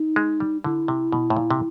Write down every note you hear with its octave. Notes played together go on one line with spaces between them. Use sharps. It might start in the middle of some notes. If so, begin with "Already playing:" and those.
Already playing: D#4
G#3
G3
D3 E4
C3
B2
A2
A#2
C3